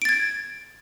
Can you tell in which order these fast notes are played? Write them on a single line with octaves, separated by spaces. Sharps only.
D7 A6 G#6